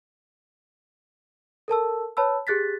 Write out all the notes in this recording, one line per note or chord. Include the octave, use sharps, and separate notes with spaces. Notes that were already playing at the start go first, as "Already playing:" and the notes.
A4 A#4 A5 E6
B4 C#5 A5 B5 E6
G4 G#4 F#6 A6 B6